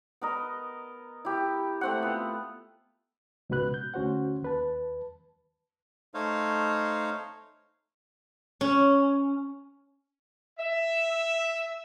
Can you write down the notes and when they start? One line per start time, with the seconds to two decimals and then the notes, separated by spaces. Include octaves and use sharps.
0.21 B3 A#4 D#5
1.25 E4 G4
1.81 A3 C4 F#5
2.02 B3 F4
3.50 C#2 G#2 B2 F#4 B4 F#6
3.74 G6
3.94 D2 C#4 F#4 C5 F#5
4.42 D#2 B4 A5
6.14 A3 D#4 C5 C#5 F5
8.61 C#4
10.58 E5